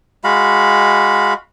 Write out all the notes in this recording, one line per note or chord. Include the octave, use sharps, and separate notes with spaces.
G#3 F#4 F5 B5